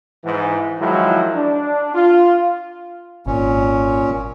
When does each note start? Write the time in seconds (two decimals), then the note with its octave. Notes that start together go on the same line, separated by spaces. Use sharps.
0.24 G#2 E3
0.79 D#3 F3 F#3 G#3 E4
1.35 D4
1.95 F4
3.27 G#1 A#2 C#4